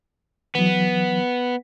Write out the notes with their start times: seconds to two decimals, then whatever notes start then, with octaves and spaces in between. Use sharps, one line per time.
0.55 E3 F#3 B3